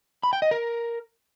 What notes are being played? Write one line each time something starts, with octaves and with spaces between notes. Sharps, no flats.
B5
G5
D#5
A#4